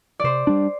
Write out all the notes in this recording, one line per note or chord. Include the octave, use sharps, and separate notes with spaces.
C3 C5 D5
G3 D4